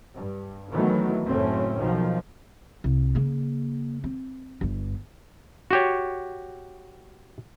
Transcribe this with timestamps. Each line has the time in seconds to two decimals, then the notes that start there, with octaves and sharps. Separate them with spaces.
0.17 G2
0.73 D#3 E3 F#3 A3 B3
1.26 F#1 A2 A3 C4 C#4
1.79 B1 D#3 F3
2.84 C2
3.15 C#3 A#3
4.04 C4
4.61 G1 G2
5.71 F#4 G4 C#5